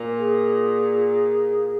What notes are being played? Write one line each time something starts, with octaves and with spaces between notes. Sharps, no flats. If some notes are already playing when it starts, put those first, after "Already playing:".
Already playing: A#2
G#4